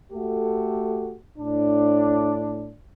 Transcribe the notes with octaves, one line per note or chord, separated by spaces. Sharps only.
A3 F#4 G4 A4
A2 D4